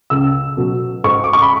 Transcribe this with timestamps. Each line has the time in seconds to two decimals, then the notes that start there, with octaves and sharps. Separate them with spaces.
0.10 C#2 E6
0.57 B2 F#3
1.04 G#2 C#6
1.24 D6
1.33 C#6
1.42 B5